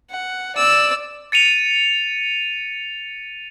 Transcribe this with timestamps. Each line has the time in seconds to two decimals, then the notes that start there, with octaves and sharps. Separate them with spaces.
0.11 F#5
0.56 D5 E6
1.32 A6 C#7 D#7 F7